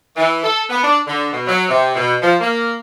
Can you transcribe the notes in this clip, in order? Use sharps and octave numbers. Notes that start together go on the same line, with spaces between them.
E3
A4
B3
D4
D3
B2
F#3
C3
B2
F3
A#3